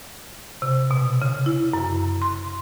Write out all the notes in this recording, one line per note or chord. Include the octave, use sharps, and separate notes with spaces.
C3
B2
C#3
E4
F#2
C6